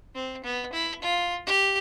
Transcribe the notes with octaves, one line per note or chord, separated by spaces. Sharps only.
C4
B3
E4
F4
G4